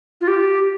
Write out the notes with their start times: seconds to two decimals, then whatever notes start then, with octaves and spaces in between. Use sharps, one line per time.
0.21 F4
0.28 G4